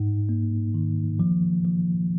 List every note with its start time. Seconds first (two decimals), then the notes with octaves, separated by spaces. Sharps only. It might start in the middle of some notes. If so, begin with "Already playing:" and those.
Already playing: G#2 D#4
0.29 A#3
0.74 D#3
1.19 F3
1.65 F3